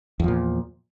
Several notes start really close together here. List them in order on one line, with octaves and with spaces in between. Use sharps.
E2 F3 A#2